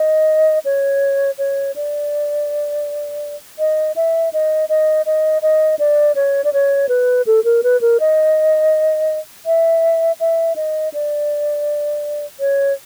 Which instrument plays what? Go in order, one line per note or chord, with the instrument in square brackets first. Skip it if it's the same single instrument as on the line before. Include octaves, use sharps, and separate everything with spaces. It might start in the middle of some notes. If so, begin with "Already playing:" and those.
Already playing: [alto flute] D#5
C#5
C#5
D5
D#5
E5
D#5
D#5
D#5
D#5
D5
C#5
D5
C#5
B4
A4
A#4
B4
A#4
D#5
E5
E5
D#5
D5
C#5